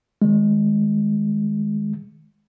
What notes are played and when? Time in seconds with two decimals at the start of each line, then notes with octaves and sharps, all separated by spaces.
0.22 D#3 G#3